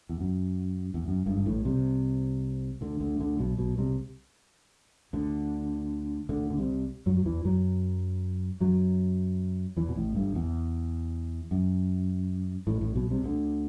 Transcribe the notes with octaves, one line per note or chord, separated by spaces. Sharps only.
E2
F#2
E2
F#2
G1 G2
G2
A1 A2
C2 C3
D2 D3
D2 D3
D2 D3
B1 B2
B1 B2
C2 C3
D2 D3
D2 D3
D3
C2 C3
F#2 F#3
F#3
E2 E3
F#2 F#3
F#2 F#3
E2 E3
B2
A1 A2
G1 G2
E2
F#2
A1 A2
A1 A2
B1 B2
C2 C3
D2 D3